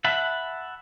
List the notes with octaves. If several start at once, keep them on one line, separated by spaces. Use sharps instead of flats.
E5 F#5 A5 B5